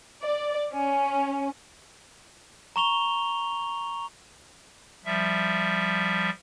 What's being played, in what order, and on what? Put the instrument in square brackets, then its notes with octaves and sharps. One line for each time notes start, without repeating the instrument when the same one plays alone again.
[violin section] D5
C#4
[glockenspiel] A#5 C#6 F7 G7
[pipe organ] F3 G3 E5